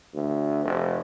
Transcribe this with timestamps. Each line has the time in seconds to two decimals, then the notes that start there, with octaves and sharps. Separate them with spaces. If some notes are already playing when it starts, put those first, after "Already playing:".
0.13 D2
0.64 F1